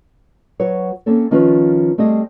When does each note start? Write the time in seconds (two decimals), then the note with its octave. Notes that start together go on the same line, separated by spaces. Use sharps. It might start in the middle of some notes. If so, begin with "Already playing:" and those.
0.60 F#3 B4 C#5
1.06 A#3 C4 C#4 A4 C#5
1.31 D#3 F3 C#4 F4 B4
1.98 G3 A3 C4 G#4 D#5